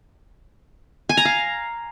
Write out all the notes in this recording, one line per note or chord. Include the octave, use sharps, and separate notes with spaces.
G#5
A#5
F5